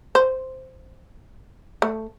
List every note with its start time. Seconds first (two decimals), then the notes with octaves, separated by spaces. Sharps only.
0.15 C5
1.82 A3